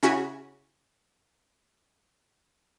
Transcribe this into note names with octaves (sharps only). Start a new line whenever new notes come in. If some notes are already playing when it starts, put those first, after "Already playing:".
C#3 C#4 E4 F#4